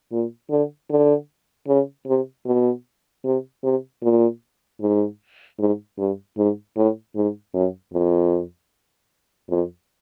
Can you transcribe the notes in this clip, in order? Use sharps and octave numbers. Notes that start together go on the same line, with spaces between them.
A#2
D3
D3
C#3
C3
B2
C3
C3
A#2
G#2
G#2
G2
G#2
A2
G#2
F#2
F2
F2